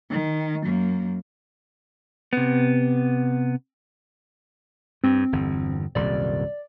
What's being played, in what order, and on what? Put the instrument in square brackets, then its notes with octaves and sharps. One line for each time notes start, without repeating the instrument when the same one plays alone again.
[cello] D#3
F#2 A#3
[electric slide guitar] C3 B3
[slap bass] G2 [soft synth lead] C4
[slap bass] G1 E2
[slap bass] D#1 C2 F#2 [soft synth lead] D5